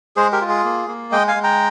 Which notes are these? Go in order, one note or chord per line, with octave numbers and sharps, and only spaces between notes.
G#3 G#4 C5
G4 A#4
F4
G#4
A#3
A#3
G#3 D#5 G5
F5 G#5
G#3
G5 A#5